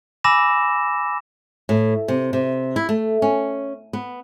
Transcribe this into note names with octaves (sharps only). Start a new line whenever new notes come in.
G#5 B5 D6 E6 A#6 E7
A2
C3
C3
E4
A3
C#4
B3